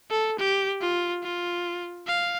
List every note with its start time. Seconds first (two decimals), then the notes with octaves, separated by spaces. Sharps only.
0.11 A4
0.39 G4
0.81 F4
1.23 F4
2.07 F5